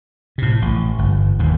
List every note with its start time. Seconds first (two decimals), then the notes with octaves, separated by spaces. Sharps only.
0.38 A2 C3
0.62 A1
0.99 G1
1.39 D#1 D#2 G#2